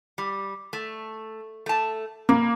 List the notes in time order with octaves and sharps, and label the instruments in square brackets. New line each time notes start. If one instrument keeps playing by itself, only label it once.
[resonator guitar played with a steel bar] G3
A3
A3 A5
[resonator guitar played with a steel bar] B2 [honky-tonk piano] A#3